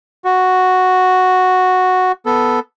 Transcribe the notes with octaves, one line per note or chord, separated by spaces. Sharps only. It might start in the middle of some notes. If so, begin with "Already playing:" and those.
F#4
B3 A4